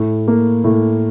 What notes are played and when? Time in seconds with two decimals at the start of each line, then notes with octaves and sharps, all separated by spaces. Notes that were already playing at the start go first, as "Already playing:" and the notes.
Already playing: A2
0.28 A#3
0.64 A2